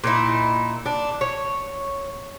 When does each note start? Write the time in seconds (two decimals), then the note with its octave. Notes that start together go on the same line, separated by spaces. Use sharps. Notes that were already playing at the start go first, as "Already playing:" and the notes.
0.04 A#2 D#4 E4
0.86 D4
1.21 C#5